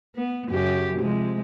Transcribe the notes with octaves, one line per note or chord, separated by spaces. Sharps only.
B3
F#2 C#3 G4
C3 F3 G#3